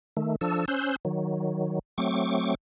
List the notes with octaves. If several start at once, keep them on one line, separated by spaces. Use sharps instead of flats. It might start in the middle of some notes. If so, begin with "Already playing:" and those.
D#3 A3
F3 D4 A4 E6
C#4 C5 E6 F#6 G6
D#3 F#3
F#3 A3 C4 C#6 D6